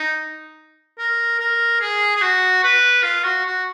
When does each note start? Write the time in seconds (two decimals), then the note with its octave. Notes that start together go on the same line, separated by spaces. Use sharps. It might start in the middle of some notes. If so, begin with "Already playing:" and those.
Already playing: D#4
0.98 A#4
1.40 A#4
1.81 G#4
2.16 G#4
2.22 F#4
2.63 B4
3.03 F4
3.24 F#4
3.45 F#4